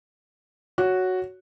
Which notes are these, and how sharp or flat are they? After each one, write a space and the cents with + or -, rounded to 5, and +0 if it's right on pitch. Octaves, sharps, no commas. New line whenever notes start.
F#4 +0 C#5 +5